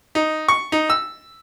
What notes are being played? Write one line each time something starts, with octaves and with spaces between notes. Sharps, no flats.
D#4
C#6
D#4
E6